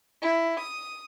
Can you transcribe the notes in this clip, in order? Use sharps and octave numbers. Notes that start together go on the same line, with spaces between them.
E4
D#6